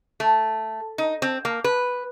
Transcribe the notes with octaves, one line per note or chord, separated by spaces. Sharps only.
A3
D#4
C4
A#3
B4